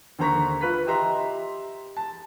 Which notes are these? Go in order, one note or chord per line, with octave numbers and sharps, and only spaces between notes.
D#2 D3 C5 A#5 C#6 B6
F4 B4 B6
G4 D#5 E5 A#5 C6
A5